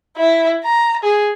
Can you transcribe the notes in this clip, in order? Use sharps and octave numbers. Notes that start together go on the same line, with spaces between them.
E4
A#5
G#4